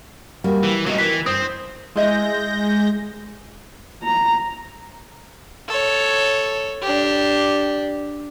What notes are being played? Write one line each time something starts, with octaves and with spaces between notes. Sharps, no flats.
G3 A#3 F#4
E3
F#3 G3 B3 D#4 F#4
D#3 E3 B6
G2 C4 D#6
G#3 E4 D#5 E5 G6 A#6
A#5
A4 C#5
D4 G4